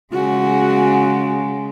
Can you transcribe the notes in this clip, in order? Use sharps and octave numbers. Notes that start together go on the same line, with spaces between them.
C#3 G#3 F#4